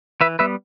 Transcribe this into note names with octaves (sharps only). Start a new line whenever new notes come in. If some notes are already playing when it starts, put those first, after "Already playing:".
E3 B4 E5
G3 B3 B4 E5